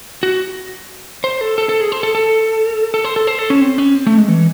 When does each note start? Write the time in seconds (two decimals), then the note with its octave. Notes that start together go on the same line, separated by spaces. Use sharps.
0.23 F#4
1.24 C5
1.41 A4
1.58 A4
1.69 A4
1.81 G#4
1.92 C5
2.03 A4
2.15 A4
2.94 A4
3.05 C5
3.16 A4
3.27 C5
3.39 A4
3.50 C#4
3.61 C4
3.78 C#4
3.95 C4
4.07 A3
4.18 G#3
4.29 E3